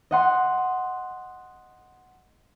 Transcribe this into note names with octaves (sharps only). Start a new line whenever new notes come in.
D#5 F#5 C6